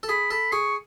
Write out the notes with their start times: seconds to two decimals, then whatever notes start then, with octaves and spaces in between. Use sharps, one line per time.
0.03 A4
0.09 G#4 B5
0.31 A4 B5
0.52 G#4 C#6